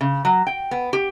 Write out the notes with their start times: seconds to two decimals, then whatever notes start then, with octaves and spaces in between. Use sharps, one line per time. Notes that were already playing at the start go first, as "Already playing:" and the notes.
0.01 C#3
0.25 F#3
0.47 G5
0.71 B3
0.93 G4